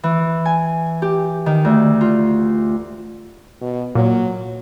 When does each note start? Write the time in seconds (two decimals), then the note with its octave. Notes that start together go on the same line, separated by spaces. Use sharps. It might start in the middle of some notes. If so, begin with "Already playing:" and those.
0.03 E3
0.45 G#5
1.02 G4
1.46 D#3
1.65 D2
2.01 F4
3.61 B2
3.95 A#2 F#3